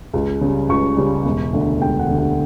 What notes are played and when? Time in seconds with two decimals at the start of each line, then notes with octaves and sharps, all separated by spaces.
0.13 C#2
0.41 C#3 G3
0.69 C#2 C#6
0.97 C#3 G3
1.25 E1
1.53 D2 D3
1.80 E1 G5
1.99 F#5
2.09 D2 D3
2.18 F#5